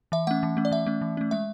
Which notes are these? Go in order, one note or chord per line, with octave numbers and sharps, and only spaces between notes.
E3 E5
A3 C#4 F#5
E3
A3 C#4
D5
E3 E5
A3 C#4
E3
A3 C#4
G#3 E5